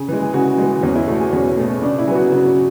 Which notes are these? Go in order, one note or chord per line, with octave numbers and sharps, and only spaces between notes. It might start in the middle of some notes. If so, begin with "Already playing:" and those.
Already playing: C#3 G#4
E3 G#3
G#4
C#3 F#4
E3 G#3
E2 C#4
E4
B2 A3 F#4
G#4
E2 C#4
B2 A3
C#3 D4
E4
F#3 B3 F#4 G#4
C#3